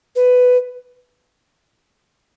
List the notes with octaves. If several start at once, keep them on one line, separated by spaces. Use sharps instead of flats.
B4